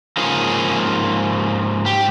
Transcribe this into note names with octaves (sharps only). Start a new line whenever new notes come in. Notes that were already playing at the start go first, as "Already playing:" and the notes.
G#2 F3 A#3 C#4 G#4
G4